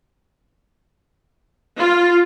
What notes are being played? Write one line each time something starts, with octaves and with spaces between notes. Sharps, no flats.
F4